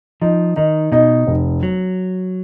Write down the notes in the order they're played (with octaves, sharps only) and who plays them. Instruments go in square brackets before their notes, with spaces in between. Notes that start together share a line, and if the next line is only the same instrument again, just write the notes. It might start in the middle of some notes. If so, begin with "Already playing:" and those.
[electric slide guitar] F3 [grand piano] D#4
[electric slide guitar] D#3 [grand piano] D#4
[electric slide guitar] B2 [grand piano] D#4
[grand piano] F1
[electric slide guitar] F#3